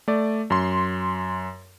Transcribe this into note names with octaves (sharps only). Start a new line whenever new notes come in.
A3 D5
F#2 C6